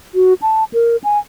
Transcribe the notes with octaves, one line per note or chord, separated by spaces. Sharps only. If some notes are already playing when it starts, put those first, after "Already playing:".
F#4
A5
A#4
G#5